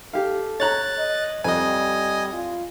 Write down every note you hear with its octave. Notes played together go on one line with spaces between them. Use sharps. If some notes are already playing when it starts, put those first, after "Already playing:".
G4 A4 F5
C#5 A#5 F#6 A6
D#5
F2 G3 D#5 G#5
F4